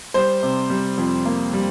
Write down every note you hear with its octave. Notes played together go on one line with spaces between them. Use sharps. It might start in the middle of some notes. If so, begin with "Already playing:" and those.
G3 C5
C3
G3
F2
A#3
G3